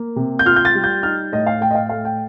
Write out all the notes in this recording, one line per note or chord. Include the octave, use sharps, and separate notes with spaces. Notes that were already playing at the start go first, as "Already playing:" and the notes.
Already playing: A#3
C3
G6
F4 F6
G6
A6
G3
G6
D#4 F6
A2 D#5
F5
A2 G5
D#5
F5
A3 F5
G5